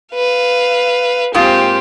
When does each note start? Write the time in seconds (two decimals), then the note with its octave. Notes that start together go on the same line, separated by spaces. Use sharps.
0.14 B4 F5
1.34 G#2 A#3 C4 F4 G4